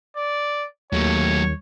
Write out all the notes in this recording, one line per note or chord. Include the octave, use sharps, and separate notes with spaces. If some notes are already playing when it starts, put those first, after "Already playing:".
D5
D#2 F#3 A3 C#5